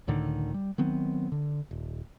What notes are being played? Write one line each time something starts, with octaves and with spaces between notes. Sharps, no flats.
C#2 A2 D3 D#3
G3
D#3 F#3 B3 C4
D3
D#1